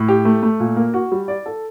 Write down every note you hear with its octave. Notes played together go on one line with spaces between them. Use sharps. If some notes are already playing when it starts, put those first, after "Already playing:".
Already playing: A2
G4
A3
A3
A#2
A#3
F#4
G3
D5
A4